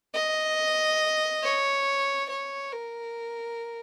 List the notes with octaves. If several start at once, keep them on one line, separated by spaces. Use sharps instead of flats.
D#5
C#5
C#5
A#4